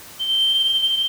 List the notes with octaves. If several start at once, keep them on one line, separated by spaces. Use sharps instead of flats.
G7